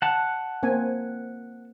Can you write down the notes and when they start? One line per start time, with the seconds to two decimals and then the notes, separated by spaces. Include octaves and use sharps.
0.02 F#5 A5
0.63 A#3 C4 G#5